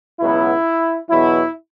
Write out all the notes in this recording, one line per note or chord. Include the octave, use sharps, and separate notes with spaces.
C#2 B2 F#3 B3 E4
E2 B2 F#3 E4